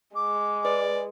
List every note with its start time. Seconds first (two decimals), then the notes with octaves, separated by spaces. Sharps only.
0.15 G#3 D6
0.65 B4 D5